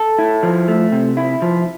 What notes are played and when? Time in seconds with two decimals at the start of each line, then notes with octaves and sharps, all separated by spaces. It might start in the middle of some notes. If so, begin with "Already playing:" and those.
Already playing: A4
0.19 E4
0.43 F3
0.68 A3
0.92 C3
1.17 E4
1.42 F3